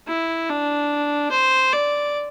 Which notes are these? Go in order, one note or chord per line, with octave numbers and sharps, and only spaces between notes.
E4
D4
C5
D5